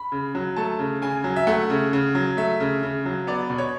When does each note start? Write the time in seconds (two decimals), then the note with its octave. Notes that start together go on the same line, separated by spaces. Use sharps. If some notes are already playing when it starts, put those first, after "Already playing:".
Already playing: B5
0.12 C#3
0.35 F#3
0.57 A3 A5
0.79 C#3
1.02 C#3 G#5
1.24 F#3
1.36 E5
1.47 A3 F#5
1.70 C#3
1.93 C#3
2.15 F#3
2.37 A3 E5
2.60 C#3
2.83 C#3
3.05 F#3
3.27 B3 D5
3.50 B2
3.58 C#5